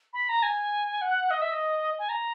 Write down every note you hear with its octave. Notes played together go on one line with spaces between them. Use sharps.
B5
A#5
G#5
F#5
D#5
E5
D#5
G#5
A#5